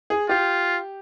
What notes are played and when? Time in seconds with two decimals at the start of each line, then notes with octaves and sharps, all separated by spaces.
0.10 G#4
0.29 F4 G4